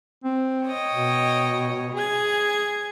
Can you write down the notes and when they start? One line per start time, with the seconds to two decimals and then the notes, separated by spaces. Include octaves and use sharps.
0.24 C4
0.64 C#5 D#5 G5
0.93 B2
1.93 G#4 G#6